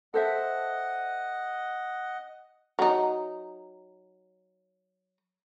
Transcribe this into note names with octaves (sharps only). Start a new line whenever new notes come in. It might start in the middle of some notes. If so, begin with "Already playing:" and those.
A4 C5 D#5 E5 F#5
F#3 D#4